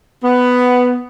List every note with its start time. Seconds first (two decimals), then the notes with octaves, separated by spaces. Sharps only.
0.24 B3